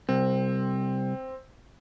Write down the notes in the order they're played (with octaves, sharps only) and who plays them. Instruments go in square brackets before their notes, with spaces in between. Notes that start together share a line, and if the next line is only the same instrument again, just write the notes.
[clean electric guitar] C2 [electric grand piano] C4